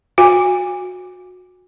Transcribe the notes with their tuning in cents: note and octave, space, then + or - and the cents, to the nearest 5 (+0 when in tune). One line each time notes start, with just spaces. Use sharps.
F#4 -25 G#5 -30